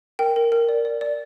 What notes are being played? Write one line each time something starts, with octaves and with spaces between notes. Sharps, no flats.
A#4 G5
A#4
A#4
D5
D5
D5